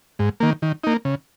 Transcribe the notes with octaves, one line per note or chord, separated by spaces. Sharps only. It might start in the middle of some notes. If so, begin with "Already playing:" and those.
G#2
D#3 A#3
D#3
A#3 D#4
C#3